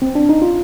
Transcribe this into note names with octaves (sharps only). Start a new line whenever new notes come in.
C4
D4
D#4
F4